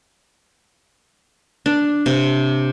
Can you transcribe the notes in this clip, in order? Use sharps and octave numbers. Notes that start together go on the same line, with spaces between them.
D4
C3